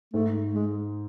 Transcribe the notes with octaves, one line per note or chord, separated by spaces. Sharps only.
G#2 A3
G#3